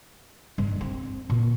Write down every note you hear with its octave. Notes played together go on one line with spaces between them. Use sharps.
G2
C4
A#2